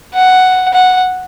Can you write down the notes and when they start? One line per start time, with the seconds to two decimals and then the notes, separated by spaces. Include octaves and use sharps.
0.14 F#5
0.73 F#5